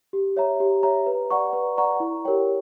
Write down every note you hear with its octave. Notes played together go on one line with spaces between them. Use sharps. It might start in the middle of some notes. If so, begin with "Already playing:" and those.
G4
C#5 E5 A#5
G4
C#5 E5 A#5
B4
D5 F#5 A#5 C#6
B4
D5 F#5 A#5 C#6
E4
G4 A#4 C#5 G5